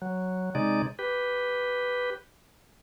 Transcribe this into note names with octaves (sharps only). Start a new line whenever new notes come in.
F#3
C3 G#3 D#4 D5
G4 B4